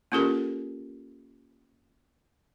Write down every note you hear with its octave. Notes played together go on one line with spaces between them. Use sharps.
A#3 C#4 F4 G4 A4 A#4